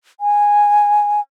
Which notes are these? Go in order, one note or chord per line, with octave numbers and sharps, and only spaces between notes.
G#5